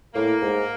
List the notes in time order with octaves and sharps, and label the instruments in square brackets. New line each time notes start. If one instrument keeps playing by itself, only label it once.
[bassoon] A2 [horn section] A#3
[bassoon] G#2